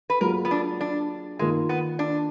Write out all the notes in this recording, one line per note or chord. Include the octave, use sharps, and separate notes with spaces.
B4
F#3 A#3 F4 G#4 A#4
B3
D4
D4
D#3 G#3 A#3 F4 A#4
B3
D4